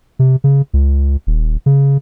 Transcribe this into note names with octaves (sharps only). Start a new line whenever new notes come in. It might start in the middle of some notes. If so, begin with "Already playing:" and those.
C3
C#3
C#2
D#1
C#3